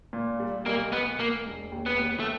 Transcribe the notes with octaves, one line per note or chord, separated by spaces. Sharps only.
A#2
G3
B1 A#3
B1 B3
B1 A#3
E1
D#2
B3
D#2
A3